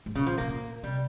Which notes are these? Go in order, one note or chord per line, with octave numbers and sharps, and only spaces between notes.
G#2
A#2 C#3
F3
C#3
C3 A#3
A#2
C3 G3